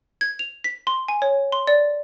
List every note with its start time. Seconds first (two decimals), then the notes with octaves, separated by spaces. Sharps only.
0.21 G#6
0.39 F7
0.64 B6
0.87 C6
1.08 G#5
1.22 C#5
1.52 C6
1.67 D5